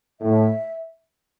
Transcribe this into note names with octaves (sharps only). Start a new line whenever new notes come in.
A2 E5